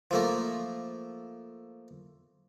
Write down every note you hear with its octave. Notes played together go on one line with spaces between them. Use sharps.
F3 A3 A#3